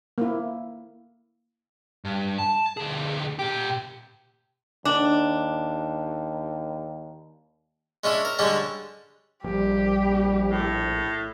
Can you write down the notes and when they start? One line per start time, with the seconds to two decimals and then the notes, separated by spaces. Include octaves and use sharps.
0.18 A#3 E4
2.05 G2
2.38 A5
2.77 D2 G#4
3.39 A#2 G4
4.85 D#2 D4
8.04 G#3 C#4 D4 E4
8.25 A#4
8.39 D3 G3 G#3 C#4 D4
9.44 A#1 G3 G4
10.50 A2